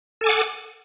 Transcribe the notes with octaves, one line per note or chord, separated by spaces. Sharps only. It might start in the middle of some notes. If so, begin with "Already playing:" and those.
A4 F#5 G#5 D6